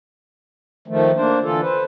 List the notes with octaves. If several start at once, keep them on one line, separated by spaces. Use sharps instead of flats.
D#3 F3 A3
A#3 D4 C5
D3 E3 F4 A4
B4 C5